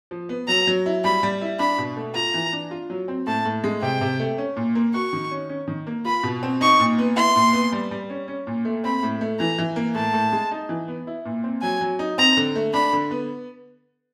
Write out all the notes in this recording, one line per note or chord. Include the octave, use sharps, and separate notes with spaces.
F3
B3
F#3 A#5
F#3
E4
G3 B5
G3
E4
D4 B5
B2
A3
F4 A#5
E3
D4
F4
F#3
C4
A2 A5
A2
G#3
C3 G5
C3
A3
C#4
A#2
A#3
F#4 C#6
D#3
C#4
C#4
D#3
A#3
F4 B5
B2
C4
D#4 C#6
A#2
B3
E4 C6
A#2
B3
G3
G3
C#4
C#4
A#2
A3
C4 B5
A2
A3
E3 A#5
E3
A#3
A2 A5
A2
G#3
D#4
E3
B3
E4
A#2
C4
F#3 G#5
F#3
D#4
C4 A#5
D3
A3
D4 B5
D3
B3